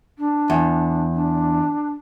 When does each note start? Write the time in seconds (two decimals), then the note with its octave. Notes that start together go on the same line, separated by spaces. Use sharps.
0.18 D4
0.50 E2
1.14 D4